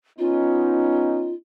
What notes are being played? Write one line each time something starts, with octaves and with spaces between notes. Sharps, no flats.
B3 C#4 D#4 F4